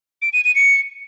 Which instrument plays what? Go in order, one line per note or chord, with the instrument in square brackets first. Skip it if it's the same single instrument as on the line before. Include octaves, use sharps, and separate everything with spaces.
[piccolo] D7
D#7
D#7
C#7